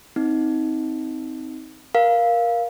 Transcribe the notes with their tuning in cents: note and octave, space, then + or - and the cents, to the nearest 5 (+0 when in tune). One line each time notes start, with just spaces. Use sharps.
C4 +0 D#4 +20
A#4 +15 F5 +0